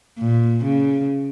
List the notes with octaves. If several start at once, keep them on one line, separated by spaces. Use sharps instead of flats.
A#2
C#3